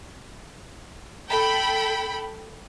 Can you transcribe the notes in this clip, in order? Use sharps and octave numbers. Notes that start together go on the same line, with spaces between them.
A4 G5 B5